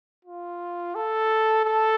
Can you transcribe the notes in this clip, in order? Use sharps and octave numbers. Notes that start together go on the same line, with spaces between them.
F4
A4
A4